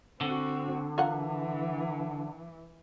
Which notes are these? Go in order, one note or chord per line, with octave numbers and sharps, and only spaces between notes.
D3 C4 F#4
E3 F4 A#4 F#5